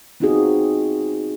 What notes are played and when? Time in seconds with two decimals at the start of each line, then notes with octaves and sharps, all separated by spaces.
0.20 B3 C4 D#4 F4 F#4 G#4